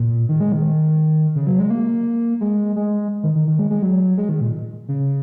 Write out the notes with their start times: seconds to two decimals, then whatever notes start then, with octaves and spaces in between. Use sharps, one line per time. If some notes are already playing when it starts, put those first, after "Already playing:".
Already playing: A#2
0.29 D#3
0.40 G#3
0.52 D#3
1.35 C#3
1.47 F#3
1.59 G#3
1.70 A#3
2.41 G#3
2.76 G#3
3.23 D#3
3.35 D#3
3.48 D#3
3.59 G#3
3.70 G#3
3.82 F#3
4.18 G#3
4.29 D#3
4.41 A#2
4.88 C#3